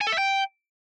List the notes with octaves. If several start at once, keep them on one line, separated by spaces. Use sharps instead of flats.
G#5
A4
E5
G5